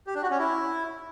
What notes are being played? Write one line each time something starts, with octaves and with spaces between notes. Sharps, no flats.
G4
D4
F#4
C#4
E4